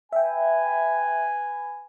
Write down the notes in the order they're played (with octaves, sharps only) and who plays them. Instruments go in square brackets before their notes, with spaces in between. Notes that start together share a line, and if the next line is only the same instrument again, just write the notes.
[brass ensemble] B4 G#5 [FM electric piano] E5 G5